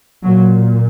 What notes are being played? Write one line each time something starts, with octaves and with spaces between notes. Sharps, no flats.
A#2 F#3